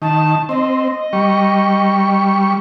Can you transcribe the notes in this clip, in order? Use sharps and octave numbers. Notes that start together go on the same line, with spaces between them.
D#3 A5
C4 D#5
G3 C#6